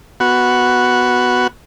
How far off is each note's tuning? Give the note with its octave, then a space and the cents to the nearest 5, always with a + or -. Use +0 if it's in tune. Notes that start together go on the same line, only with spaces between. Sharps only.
B3 +0 F#4 +0